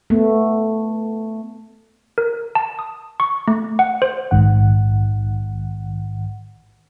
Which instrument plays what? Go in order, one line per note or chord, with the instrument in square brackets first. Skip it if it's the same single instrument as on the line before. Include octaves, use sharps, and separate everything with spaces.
[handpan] A3 B3
[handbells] A#4
A5
D#6
C#6
A3
F#5
C5
[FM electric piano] A#1 G#2 D#3 F#5